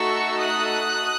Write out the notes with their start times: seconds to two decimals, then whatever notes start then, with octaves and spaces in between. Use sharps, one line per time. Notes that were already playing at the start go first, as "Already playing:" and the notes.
Already playing: A3 D#4 F#4 A4 C#6 E6
0.39 D#6 F#6